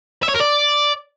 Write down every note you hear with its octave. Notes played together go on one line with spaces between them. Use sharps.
E5
C#5
A#4
D5